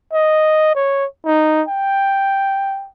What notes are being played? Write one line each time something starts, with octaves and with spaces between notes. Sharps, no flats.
D#5
C#5
D#4
G5